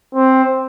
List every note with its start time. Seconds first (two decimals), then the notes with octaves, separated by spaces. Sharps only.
0.15 C4